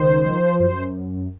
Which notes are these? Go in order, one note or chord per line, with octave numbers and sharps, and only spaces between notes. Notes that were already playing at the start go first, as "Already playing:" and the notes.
Already playing: C#2 D#3 C5
F3
F#2 C5